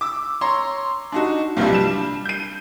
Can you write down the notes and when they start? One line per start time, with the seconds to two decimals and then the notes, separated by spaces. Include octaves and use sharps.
0.01 D6 E6
0.41 C#5 A#5 C6
1.12 D4 D#4 F#4
1.57 C2 G2 C3 F3 G3
1.72 G3 D4 E7
2.25 G6 D#7